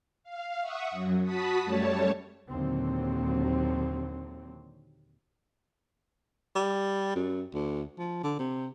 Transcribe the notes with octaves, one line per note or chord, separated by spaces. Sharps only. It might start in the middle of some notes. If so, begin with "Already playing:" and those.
F5
E5 F#5 C#6 D#6
F#2 F#3
F#4 A5 B5 D#6 B6
F#2 G3 A3 C#5 A5
D#2 A#2 D3 F#3 C4
G3
F#2
D2
F3
D3
C3